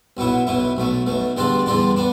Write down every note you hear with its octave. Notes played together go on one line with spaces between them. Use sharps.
B1 B2 B3 E4
B1 B2 B3 E4
B1 B2 A3
B1 B2 A3
E2 D3 G3 D4 F4
E2 D3 G3 D4 F4
B3 D4